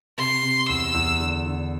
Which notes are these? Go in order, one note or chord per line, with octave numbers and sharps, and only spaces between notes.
C3 C6
C3
E2 E6
E2
D3
D3